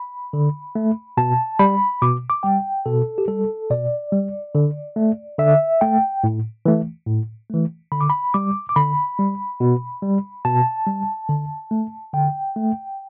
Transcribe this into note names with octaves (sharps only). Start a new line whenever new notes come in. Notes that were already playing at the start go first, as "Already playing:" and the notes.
Already playing: B5
D3
A3
B2 A5
G3 B5
B2 D6
D6
G3 G5
B2 A4
G4
G3 A4
B2 D5
G3
D3
A3
D3 E5
A3 G5
A2
E3 A3
A2
E3 A3
D3 B5
D6
B5
G3 D6
D6
D3 B5
G3
B2
G3
B2 A5
G3
D3
A3
D3 G5
A3